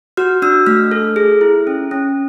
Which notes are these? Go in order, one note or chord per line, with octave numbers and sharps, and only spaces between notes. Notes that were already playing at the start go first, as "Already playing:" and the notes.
F#4 F6
D4 E6
A3 F6
A4
G#4
E4
C#4
C#4